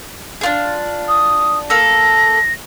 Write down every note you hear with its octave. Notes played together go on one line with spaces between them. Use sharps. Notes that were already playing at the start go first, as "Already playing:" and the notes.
D4 F4 G#4
D#6
A#3 A4 A#6